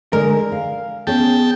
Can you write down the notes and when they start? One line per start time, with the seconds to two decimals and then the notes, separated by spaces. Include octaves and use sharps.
0.13 D3 G#3 A#4
0.52 F5
1.07 B3 C#4 G#4 G5 A5